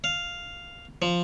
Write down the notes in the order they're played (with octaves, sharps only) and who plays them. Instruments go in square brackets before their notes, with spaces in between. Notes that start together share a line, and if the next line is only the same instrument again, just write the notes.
[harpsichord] F5
F3